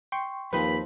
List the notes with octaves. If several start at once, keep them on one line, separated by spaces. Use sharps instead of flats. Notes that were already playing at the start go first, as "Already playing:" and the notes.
G5 C6 C#6
D#2 F3 C4 D#4 B4 B5